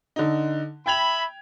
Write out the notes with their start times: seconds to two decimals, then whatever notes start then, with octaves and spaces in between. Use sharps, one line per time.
0.16 D3 D#4
0.86 E5 G5 B5 G#6 F7